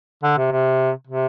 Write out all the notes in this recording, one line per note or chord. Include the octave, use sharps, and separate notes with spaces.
D3
C3
C3
C3